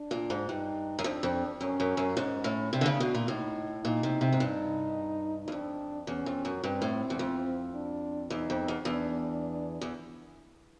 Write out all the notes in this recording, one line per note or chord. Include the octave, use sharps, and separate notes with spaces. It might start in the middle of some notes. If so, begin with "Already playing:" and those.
Already playing: D4
A#2
G#2
G2 D#4
F#2
F2 D4
F2
F#2 C#4
F#2
F#2
G#2 C#4
A2
C3 D4
D3
C#3
B2
A#2
A2 D#4
A#2 D#4
C3
C3
G#2
G2 D#4
E2
F2 D4
E2 C#4
F2
F#2
G2 C4
A2
E2
F2
D4
E2 D#4
F2
E2
E2 D4
E2